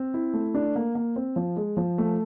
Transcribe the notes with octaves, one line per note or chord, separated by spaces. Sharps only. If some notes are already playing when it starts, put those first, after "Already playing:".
Already playing: C4
E4
A3
D4
A#3
A#3
C4
F3
G#3
F3
A3